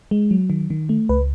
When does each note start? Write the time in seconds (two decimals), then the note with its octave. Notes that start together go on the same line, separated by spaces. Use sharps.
0.11 G#3
0.31 F#3
0.50 D#3
0.70 D#3
0.89 A3
1.09 C#2 B4